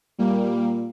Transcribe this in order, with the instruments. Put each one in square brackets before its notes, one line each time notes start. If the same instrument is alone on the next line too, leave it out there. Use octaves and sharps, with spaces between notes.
[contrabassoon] A#2 [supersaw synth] G3 A#3